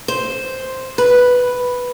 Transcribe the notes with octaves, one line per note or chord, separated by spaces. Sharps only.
C5
B4